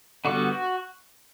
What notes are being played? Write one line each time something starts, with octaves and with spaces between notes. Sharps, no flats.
D3 G3 B3 F#4
F#4